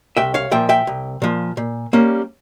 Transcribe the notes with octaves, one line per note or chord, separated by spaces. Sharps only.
C2 E5 G5
C#5 F5
A#2 F3 E5 G5
E5 G5
C2
A#2 F3
A#2
G3 A#3 C#4